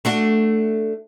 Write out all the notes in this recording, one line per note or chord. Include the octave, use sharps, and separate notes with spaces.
A3 D4 F#4